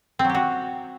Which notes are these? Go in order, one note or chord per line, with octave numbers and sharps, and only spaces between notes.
C4
F#3
G4
F#4